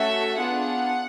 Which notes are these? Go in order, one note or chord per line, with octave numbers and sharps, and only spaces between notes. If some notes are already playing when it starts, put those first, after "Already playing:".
Already playing: A3 C#4 F#4 A4 E5
B3 D4 F4 G#4 F#5